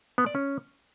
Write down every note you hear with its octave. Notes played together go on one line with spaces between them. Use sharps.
B3
D5
C#4